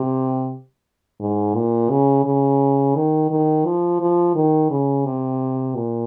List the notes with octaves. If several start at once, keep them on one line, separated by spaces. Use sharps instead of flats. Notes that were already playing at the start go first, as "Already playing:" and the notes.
Already playing: C3
G#2
A#2
C#3
C#3
D#3
D#3
F3
F3
D#3
C#3
C3
A#2